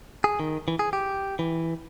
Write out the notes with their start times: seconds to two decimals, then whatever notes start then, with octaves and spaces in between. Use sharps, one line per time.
0.24 G#4
0.40 D#3
0.68 E3
0.79 G#4
0.93 G4
1.39 E3